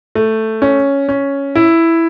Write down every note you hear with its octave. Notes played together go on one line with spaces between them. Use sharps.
A3
C#4
C#4
E4